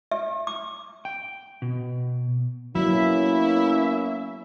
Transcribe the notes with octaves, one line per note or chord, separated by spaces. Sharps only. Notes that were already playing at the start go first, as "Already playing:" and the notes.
E5
D6
G5
B2
F#3 A#3 B3 C#4 E4 E5